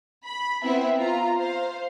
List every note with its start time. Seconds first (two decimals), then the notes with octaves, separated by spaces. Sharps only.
0.24 B5
0.63 B3 C4 E4 E5
0.98 F4 A#5
1.38 C5 F5